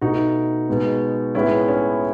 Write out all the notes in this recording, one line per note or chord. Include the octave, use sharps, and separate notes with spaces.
B2 A3 D#4 F#4
B2 G#3 B3
A2 G#3 B3 C#4 E4
C#4